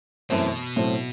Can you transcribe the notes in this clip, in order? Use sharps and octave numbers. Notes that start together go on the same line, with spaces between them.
F#2 B2 E3 A3 C4
A2 F#3 A3 C4